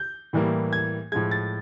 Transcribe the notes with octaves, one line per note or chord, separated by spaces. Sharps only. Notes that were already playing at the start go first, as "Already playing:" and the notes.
Already playing: G6
A2 E3 G3 A#3
G#6
A2 F3 G#3 G#6
A6